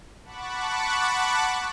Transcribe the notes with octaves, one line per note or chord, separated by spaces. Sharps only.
F#5 A5 B5 C#6 D6 F#6